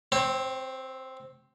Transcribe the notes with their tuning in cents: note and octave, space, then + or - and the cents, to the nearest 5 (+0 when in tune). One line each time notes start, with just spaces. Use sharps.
C4 +0 C#5 -40